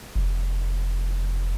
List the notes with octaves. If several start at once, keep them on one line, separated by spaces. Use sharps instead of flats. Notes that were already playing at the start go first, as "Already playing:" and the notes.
F1